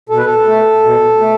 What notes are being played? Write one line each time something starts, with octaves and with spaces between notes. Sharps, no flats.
B2 A4
B4
A4
A3
B2
A3